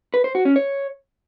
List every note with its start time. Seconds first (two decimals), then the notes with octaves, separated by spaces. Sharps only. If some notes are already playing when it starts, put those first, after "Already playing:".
0.14 B4
0.24 C5
0.35 F#4
0.45 C#4
0.56 C#5